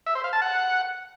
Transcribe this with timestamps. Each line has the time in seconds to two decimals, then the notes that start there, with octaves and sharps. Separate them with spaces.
0.06 E5
0.15 C5
0.24 F5
0.33 A5
0.42 F#5